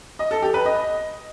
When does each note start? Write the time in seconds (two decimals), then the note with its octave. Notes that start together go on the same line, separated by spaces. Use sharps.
0.19 D#5
0.31 A4
0.42 G4
0.54 B4
0.66 D#5